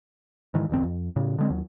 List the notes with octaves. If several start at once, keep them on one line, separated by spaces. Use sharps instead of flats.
G#2 D#3 E3
D1 G1 E2 C4
F2
A2 C#3
D3 G#3 C4
D#2 F#3